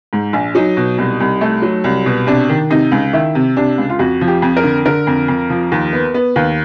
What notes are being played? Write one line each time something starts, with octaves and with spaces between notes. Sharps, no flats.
G#2
A#1
F#3 D#4
B2
C2
C2
A3
F#3
C2
B2
C3 D4
D#3
C3 D#4
C#2
D#3 E4
C3
C3 D4
C#2
F4
F2 F#4
F3
G4
F2
A#4
D3
D3 A#4
F2
F2
F3
D#2
B3
B3
D#2